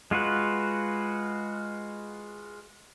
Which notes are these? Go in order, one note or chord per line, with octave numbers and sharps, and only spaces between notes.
G#3 F4 F#4 B4